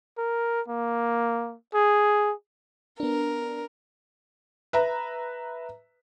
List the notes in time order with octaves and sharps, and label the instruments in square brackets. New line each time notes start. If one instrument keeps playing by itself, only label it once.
[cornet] A#4
A#3
G#4
[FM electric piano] B3 D4 [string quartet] A#4
[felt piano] B4 E5 A#5